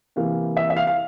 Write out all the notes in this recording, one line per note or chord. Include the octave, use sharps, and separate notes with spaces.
C3 E3 A#3 F5
E5
E5
F5
F5